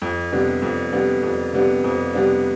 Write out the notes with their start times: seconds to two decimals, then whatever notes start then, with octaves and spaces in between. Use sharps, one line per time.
0.02 F2
0.32 C3 G3 B3 D4
0.62 F2
0.93 C3 G3 B3 D4
1.23 F2
1.53 C3 G3 B3 D4
1.84 F2
2.13 C3 G3 B3 D4